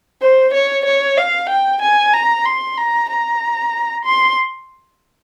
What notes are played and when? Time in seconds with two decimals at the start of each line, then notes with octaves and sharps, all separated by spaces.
0.21 C5
0.54 C#5
0.85 C#5
1.17 F5
1.49 G5
1.82 G#5
2.14 A#5
2.45 C6
2.77 A#5
3.09 A#5
4.05 C6